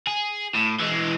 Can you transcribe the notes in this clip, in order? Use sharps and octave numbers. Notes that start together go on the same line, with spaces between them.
G#4
A2
E3 G#3